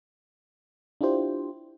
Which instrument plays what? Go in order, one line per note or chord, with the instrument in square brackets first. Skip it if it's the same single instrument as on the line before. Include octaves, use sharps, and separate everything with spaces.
[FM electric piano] D4 E4 F4 G4 C5